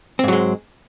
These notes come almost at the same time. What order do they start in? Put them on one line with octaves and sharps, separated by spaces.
C4 G#2 F#3 G#3